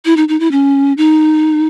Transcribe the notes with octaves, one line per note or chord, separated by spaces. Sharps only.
E4
D#4
D#4
E4
C#4
D#4